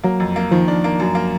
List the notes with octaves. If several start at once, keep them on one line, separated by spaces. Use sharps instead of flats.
F#3 A#3
F2
A#3
D#3 F3
D4
A#3
F#2
A#3